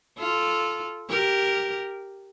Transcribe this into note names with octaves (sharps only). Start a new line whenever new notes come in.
F4 A4
G4 A#4